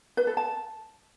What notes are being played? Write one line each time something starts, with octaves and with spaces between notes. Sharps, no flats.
B4
A4
A5